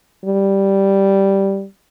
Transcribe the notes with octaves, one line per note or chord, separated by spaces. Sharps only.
G3